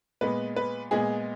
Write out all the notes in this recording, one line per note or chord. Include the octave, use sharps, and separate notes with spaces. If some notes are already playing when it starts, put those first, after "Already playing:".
A#2 G#3 B3 B4
B4
A#2 G#3 B3 G#4